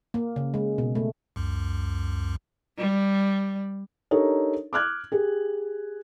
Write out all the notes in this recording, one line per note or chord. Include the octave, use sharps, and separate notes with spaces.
A#3
C#3
G#3
B2
A3
C#2 F#2
G3
D4 D#4 G4 A4 A#4 C#5
D6 F6 F#6 G#6
G4 G#4